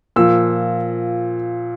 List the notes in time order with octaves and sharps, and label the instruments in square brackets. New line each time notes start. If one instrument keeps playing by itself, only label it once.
[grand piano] A#2 F3 E6